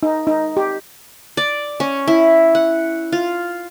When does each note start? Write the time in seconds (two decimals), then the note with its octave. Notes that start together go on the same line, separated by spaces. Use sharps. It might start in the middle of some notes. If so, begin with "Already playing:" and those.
0.03 D#4
0.27 D#4
0.57 G4
1.37 D5
1.80 C#4
2.08 E4
2.55 F#5
3.12 F4